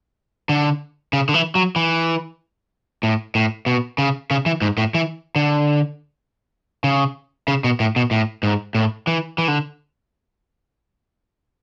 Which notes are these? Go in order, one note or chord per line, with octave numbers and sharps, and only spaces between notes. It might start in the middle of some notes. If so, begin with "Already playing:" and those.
D3
C#3
D3
E3
F#3
E3
A2
A2
B2
C#3
C#3
E3
G#2
A2
E3
D3
C#3
C#3
B2
A2
B2
A2
G#2
A2
E3
E3
D3